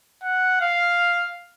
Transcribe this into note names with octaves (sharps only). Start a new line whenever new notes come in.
F#5
F5